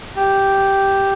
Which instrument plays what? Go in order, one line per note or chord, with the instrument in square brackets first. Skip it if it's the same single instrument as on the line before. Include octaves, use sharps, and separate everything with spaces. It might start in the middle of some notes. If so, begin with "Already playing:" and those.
[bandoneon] G4